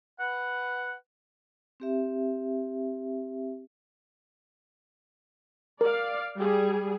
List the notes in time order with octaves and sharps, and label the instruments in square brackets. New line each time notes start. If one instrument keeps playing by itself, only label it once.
[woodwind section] B4 F#5
[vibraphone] C4 G4 E5
[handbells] A#4 [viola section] D5 F5
[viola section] G3 G#4